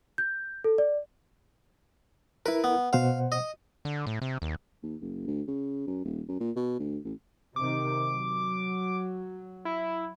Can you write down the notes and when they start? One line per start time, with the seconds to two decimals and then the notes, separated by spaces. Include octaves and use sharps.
0.18 G6
0.64 A4
0.78 D5
2.46 E4 A#4 B4
2.64 B3
2.93 B2 C5 F5 F#5
3.32 D#5
3.85 D3
4.07 A2
4.22 C3
4.42 D#2
4.83 D#2
5.01 F#1
5.27 D2
5.48 C#3
5.87 F#2
6.05 D#1
6.28 F#2
6.40 A#2
6.56 B2
6.79 D2
7.05 A1
7.56 C3 D#3 D6
8.09 F#3
9.65 E4